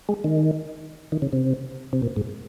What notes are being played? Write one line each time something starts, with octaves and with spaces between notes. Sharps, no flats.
G#3
D#3
D#3
C#3
C3
C3
A#2
G#2